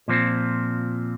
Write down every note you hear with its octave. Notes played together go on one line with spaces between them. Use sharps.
A#2 F3 C4